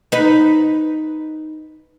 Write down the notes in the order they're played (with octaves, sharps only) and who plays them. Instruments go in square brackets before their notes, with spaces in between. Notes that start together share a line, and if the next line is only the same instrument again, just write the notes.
[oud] D#4 B4